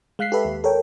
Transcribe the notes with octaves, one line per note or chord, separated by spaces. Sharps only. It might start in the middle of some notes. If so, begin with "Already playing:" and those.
G#3 F5 F#6 B6 C7
G4 A4 B4 E5
D#2
A4 A#4 C#5 G5